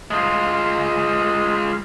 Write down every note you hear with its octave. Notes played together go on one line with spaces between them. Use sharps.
G#3 F4